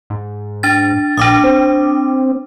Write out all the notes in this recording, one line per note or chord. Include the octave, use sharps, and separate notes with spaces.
G#2
D4 A6
A#1 D4 D6 D#6
C4